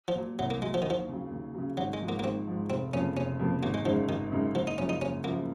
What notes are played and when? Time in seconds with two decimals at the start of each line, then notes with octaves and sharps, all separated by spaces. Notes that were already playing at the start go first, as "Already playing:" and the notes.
0.08 F3
0.15 A#2 F#3
0.39 C2 F#3
0.50 A#3
0.62 A#2 F#3 G#3
0.74 F3
0.82 D#3
0.85 D#2 F3
1.09 C#3 F#3
1.32 D#2
1.54 C#3 F#3
1.77 G#1 F#3
1.93 G#3
2.01 G#2 F3
2.09 A#3
2.19 A#3
2.24 G#1 C4
2.47 G#2 F3
2.70 F1 C4
2.93 F2 C#3 F3 A#3 C#4
3.16 F1 C#4
3.39 F2 C#3 F3 A#3
3.63 G#1 A#3
3.74 G#3
3.85 F#2 C#3 F3 G#3 D#4
4.09 G#1 D#3
4.32 F#2 C#3 G#3 D#4
4.55 F#1 F3
4.67 D#4
4.78 F#2 C#3 F3 C#4
4.89 D#4
5.01 F#1 C#4
5.24 F#2 C#3 F3 A#3